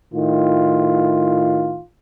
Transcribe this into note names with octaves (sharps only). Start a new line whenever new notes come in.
A2 D#3 F4